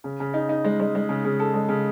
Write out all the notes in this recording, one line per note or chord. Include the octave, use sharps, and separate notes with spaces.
C#3
C#3
D#4
D#4
G#3
G#3
G#3
C#3
C#3
A4
G#3
C#3